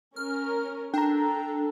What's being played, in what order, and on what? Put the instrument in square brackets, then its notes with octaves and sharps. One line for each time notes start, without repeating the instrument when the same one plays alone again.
[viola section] C#4 A#4 [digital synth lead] F6
[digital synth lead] D4 [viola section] A4 [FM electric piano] G5 A#5